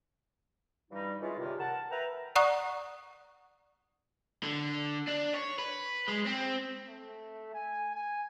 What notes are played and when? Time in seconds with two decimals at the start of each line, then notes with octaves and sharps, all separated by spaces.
0.91 G2 E3 G3 D#4
1.21 D#3 E3 G#3 C#4 E4 F4
1.37 C#2 G2 C3 D#3
1.59 A#4 F#5 A5
1.91 A#4 B4 E5 G5 A#5
2.36 D5 F#5 A#5 C#6 D#6 F#6
4.43 D3
5.08 D4
5.34 C#5
5.59 B4
6.09 G#3
6.27 C4
6.88 A3
7.54 G#5
7.95 G#5